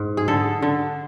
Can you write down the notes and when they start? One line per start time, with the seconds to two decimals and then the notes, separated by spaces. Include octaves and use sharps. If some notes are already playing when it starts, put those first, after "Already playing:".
Already playing: G#2
0.17 G#4
0.28 D3 A4
0.62 D3